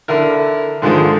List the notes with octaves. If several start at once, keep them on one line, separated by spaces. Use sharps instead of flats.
D3 E4 A#4
G#2 D3 D#3 F3 G#3